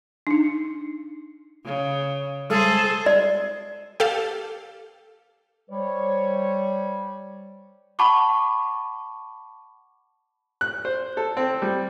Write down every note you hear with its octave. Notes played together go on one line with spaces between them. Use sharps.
D4 D#4
C#3
G3 G#3 G#4 A4 C5
D5
G4 A4 F5
G3 C5 C#5
F#5 A5 B5 C#6 D6
F#6
C5
A4
C4
G3